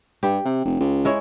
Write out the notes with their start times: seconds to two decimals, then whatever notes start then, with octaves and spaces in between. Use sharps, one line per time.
0.23 G2 G4
0.45 C3
0.65 F1
0.80 C#2
1.05 G#3 E4 C#5